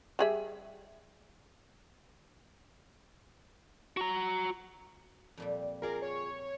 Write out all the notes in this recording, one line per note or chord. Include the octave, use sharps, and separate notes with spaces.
G3 G#4 E5
F#4 A#5
F2 A#2 G3
F4 G#4 A#4 D5
C#5